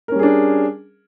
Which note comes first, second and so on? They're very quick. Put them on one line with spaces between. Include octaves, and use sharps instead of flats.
A#4 C#4 G3 G#4 D4